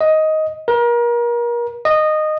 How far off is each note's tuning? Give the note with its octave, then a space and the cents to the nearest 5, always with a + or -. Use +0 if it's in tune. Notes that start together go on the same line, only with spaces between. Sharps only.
D#5 +10
A#4 +35
D#5 -15